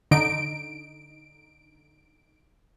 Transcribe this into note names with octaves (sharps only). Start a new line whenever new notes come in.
D3 D#4 D7